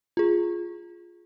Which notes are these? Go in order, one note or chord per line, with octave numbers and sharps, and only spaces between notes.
F4 G#4